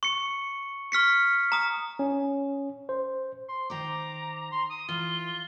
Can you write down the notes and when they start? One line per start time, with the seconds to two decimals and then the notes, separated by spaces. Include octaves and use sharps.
0.03 C#6 C#7
0.92 C#6 F6 B6 C#7
1.52 A#5 D#6
1.99 C#4
2.89 C5
3.49 C6
3.70 D#3 C5 A#5 D6
4.52 C6
4.70 D#6
4.89 E3 F4 G7